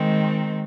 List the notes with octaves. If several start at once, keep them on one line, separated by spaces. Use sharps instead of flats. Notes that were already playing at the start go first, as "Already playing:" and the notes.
Already playing: D#3 G#3 C4